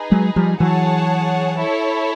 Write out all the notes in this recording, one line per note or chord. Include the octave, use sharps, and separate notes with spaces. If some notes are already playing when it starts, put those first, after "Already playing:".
Already playing: D#4 G#4 B4
F#3 G#3
F3 G3
E3 F#3 G#4 C#5 F#5 A5
E4 A4 C#5